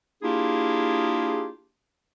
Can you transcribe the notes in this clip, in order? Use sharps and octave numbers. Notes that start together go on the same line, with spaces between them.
A#3 D4 E4 F4 G4 G#4